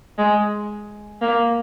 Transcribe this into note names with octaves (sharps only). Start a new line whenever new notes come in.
G#3
A#3